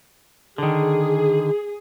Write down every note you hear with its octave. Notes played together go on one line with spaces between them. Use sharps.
D3 D#3 G#4